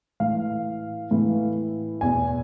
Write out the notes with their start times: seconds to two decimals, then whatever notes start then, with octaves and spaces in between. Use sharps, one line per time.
0.20 A2 E3 F5
1.11 A2 E3
2.01 E2 B2 G#5